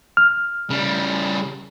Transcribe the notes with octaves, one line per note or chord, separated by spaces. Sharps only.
F6
C#3 G3